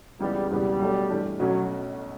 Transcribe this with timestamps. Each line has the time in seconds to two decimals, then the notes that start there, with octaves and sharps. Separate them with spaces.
0.20 C#2 C#3 E3 G3 B3
0.50 E1 E2 C#3 E3 G3 B3
0.80 B1 B2 A3 D4 A4
1.10 G2 E3 A3 D4 G4
1.39 B1 B2 F#3 A3 C#4 F#4